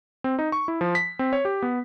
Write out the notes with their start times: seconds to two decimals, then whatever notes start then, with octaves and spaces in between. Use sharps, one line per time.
0.24 C4
0.39 D#4
0.52 C#6
0.68 E4
0.81 F3
0.95 B6
1.19 C4
1.33 C#5
1.45 G4
1.62 B3